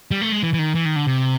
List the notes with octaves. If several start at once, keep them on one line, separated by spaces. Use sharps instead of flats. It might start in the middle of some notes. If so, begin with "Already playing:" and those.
G3
A3
G#3
E3
E3
D#3
E3
D#3
D3
C3